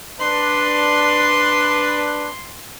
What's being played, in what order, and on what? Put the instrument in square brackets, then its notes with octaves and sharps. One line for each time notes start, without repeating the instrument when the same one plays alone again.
[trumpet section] D4 B4 [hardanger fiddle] C6